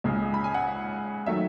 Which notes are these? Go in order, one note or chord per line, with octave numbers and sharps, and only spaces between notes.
C#2 C#3 G#3
B5
G#5
F#5
D#3 F#3 A3 E5